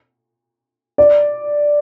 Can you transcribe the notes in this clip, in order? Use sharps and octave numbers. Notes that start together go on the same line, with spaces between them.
D5